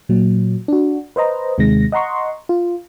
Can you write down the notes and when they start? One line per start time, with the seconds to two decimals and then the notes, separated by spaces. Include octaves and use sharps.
0.09 A#2 F#3
0.68 D4 F#4
1.16 B4 C5 D#5 A#5
1.58 D#2 C3 D#3 G#3 A#6
1.92 D#5 F#5 A#5 C6 C#6
2.49 F4